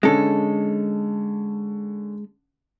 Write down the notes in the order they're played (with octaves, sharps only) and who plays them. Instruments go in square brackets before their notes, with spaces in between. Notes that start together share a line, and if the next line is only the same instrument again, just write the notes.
[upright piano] D3 C#4 [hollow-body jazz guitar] G#3 A4